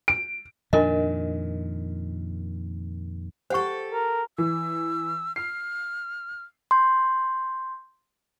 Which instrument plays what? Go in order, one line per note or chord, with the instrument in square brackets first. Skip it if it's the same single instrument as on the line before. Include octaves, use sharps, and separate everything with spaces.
[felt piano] D7
[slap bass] F2 A#2 D#3 [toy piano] D4 A#4 D#5
[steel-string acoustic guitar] G4 A4 [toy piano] C5 F#5 C#6
[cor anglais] A#4
[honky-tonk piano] E3 [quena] E6
[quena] F6 [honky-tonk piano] C7
[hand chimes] C6 G6